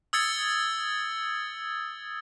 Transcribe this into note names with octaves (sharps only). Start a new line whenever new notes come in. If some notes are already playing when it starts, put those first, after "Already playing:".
D#6 E6 G#6 A6 C#7